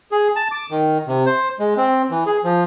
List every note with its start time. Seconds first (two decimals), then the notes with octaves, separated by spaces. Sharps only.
0.12 G#4
0.36 A5
0.52 D6
0.71 D#3
1.07 C3
1.26 C5
1.59 G#3
1.77 C4
2.10 E3
2.26 G#4
2.44 F3